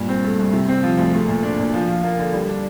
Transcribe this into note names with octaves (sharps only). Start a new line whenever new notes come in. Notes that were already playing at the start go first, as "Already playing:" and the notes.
Already playing: G2 A#2
C4
A3
C2
C3
C4
F3
D2
A3
A#2
D4
A#2
F3
F4
A#3
D3
G3
D4